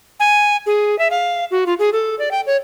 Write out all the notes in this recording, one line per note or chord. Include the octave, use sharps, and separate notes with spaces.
G#5
G#4
E5
F5
F#4
F4
G#4
A4
D5
G5
C#5